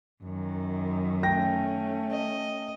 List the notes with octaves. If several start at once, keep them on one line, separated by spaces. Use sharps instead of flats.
F#2 D#3
A3 C#4 G5 A#6
D#5